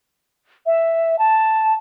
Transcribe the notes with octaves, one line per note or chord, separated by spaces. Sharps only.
E5
A5